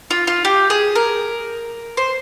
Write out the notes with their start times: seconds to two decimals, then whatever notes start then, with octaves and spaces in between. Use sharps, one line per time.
0.11 F4
0.27 F4
0.45 G4
0.70 G#4
0.95 A#4
1.97 C5